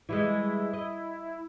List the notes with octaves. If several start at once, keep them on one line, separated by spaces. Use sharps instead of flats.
E3 G3 G#3 E4
D#5